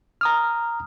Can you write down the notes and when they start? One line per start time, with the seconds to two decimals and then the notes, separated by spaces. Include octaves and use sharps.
0.21 A#5 D#6 F6